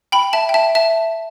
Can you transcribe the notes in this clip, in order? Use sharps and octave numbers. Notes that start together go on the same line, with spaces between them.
G5 B5
E5 A5
G5
E5 A5
E5 A5